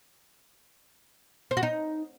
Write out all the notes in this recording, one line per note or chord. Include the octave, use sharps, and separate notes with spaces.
C5
F#4
D#4